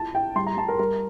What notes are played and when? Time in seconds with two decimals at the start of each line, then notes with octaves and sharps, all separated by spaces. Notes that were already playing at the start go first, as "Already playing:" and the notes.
Already playing: E4 F4 A5
0.14 E4 G5
0.36 G3 C6
0.47 A#5
0.57 G3 A5
0.68 A#4
0.79 G3 A#4